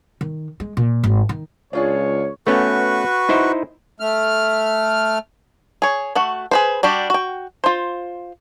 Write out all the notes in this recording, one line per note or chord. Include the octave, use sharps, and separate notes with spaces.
D#3
G#3
A#2
G#1
D#3
C#2 D4 F4 G#4 C#5
A3 B3 C#4 F#4 B4 C#6
D#4 E4 C5
A3 F6
G#4 C#5
A3 F#4 F#5
G#4 B4 C5
G3 D4 F#4 G4
F#4 G5
F4 C5